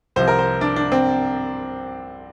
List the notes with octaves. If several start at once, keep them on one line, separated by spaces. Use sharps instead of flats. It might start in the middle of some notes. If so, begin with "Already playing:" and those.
C2 C3 F3 C5
A#4
C5
D4
D4
C4